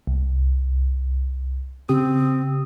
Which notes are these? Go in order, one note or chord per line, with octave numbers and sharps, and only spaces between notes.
C2
C#3 C4 G4 D#6